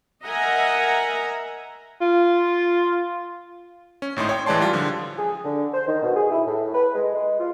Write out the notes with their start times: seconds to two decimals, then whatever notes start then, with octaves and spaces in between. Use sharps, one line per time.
0.25 A#4 D#5 E5 F#5 G#5 A#5
2.01 F4
4.02 C#4
4.16 G#1 A2 D#4 C6
4.29 C#5 G5
4.46 A1 E3 G#3 D5 A5 C6
4.61 G3 F4
4.73 D3 F3
5.18 G#4
5.45 D3
5.74 C5
5.88 D#3
6.03 B2
6.16 G#4
6.31 E4
6.47 A2
6.74 B4
6.95 G#3
7.15 G#3
7.40 F4